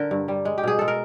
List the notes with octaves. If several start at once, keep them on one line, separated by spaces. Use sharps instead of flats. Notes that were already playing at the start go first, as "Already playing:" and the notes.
Already playing: D3 A#4
G2
G3
G#3
G4
B2 G#4
G#3 A4
A#4